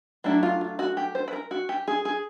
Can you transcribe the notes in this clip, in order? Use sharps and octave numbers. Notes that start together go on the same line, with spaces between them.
F#3 A3 D4 E4
F4
F4
F#4
G4
C5
B4
A#4
F#4
G4
G#4
G#4